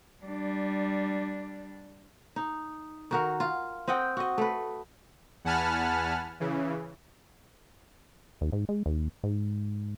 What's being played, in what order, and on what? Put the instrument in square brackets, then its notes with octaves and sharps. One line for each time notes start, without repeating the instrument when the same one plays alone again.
[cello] G3 D4
[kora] D#4
D#3 F#4 A#4
F4
C4 D#5 F#5 G5
F#4 D#5
A3 B4
[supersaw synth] E2 F#5 G#5 A5 B5 F6
C#3 E3
[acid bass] D#2
G#2
G#3
D#2
G#2